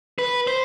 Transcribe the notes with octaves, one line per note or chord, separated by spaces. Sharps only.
B4
C5